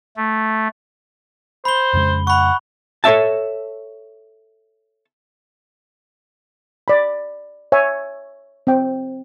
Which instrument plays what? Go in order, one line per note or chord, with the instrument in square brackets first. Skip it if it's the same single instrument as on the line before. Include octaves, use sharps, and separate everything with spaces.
[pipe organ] A3
[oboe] C5 [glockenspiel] B5 G7
[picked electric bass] F2 C#3 G#3
[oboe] F#5 [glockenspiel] B5 C#6
[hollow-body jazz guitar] A4 C#5 D5 E5 A5
[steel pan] D5 B5
C#5 E5 G#5
C4 G5